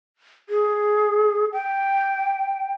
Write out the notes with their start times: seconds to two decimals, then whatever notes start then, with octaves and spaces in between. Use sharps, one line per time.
0.49 G#4
1.53 G5